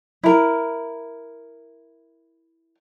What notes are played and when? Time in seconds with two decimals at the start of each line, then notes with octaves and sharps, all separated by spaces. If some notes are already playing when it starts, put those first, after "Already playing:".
0.23 E4 A#4